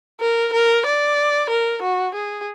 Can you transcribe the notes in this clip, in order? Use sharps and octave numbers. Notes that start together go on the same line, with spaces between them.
A#4
A#4
D5
A#4
F#4
G#4